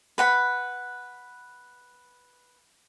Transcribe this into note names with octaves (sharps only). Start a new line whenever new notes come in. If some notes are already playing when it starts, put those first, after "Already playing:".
B4 F#5 B5